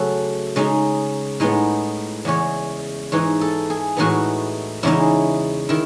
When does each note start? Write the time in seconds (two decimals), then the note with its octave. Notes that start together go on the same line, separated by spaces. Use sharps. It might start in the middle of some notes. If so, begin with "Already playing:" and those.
Already playing: C#3 F#3 A3 C#4 A4
0.56 C#3 G#3 D#4
1.40 A2 G#3 B3 D#4
2.25 E2 C#3 G#3 C#4 C#5
3.12 G#2 E3 G#3 D#4 C#5
3.41 A4
3.70 G#4
3.97 A2 E3 G#3 B3 D#4 F#4
4.83 E2 C#3 G#3 D#4 E4
5.69 D#3 E4